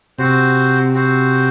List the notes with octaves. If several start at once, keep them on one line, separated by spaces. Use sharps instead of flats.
C3 C4 F#4 C5
C4 F#4 C5